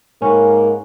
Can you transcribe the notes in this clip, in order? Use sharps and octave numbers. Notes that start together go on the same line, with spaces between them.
G#2 A#3 C#4 F#4 B4